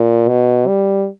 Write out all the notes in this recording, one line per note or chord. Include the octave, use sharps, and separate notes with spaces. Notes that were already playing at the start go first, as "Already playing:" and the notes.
Already playing: A#2
B2
G3